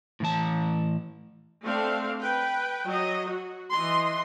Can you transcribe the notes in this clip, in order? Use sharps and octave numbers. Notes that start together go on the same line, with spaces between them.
A2 E3 A5
A3 C4 D4 F5
B4 G5
F#3 D#5
F#4
E3 D#5 C6